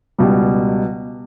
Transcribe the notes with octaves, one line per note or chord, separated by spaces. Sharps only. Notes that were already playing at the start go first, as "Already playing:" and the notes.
C#2 B2 G3